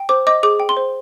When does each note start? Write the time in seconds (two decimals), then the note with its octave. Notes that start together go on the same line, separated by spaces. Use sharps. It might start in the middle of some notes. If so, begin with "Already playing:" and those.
Already playing: G5
0.09 C5 D6
0.27 D#5 D6
0.43 G#4 D6
0.60 G5
0.69 C6
0.77 C5